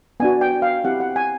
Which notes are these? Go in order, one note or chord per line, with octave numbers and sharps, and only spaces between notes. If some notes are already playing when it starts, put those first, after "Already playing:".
B3 D4 F#4 G#5
G5
F5
C4 E4 G4 F#5
F#5
G#5